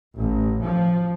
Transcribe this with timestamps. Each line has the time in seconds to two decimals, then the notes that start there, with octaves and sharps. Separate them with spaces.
0.18 A1
0.63 F3